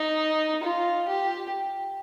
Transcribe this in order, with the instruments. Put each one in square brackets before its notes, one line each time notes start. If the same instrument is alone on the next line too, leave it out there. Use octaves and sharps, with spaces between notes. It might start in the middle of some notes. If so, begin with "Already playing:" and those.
Already playing: [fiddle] D#4
F4
G4